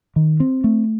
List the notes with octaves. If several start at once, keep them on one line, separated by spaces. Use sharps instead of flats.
D#3
C4
A3